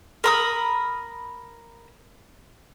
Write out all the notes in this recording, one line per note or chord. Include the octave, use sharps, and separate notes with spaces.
A#4 B5 D#6